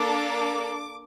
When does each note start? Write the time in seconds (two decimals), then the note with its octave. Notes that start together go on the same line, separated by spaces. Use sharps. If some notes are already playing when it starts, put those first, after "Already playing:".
Already playing: A#3 D4 A4 D6